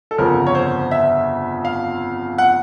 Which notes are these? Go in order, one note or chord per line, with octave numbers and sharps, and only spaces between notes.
A4
G1 F2 C#3 F3 A#4
C#5
C5
E5
F5
F#5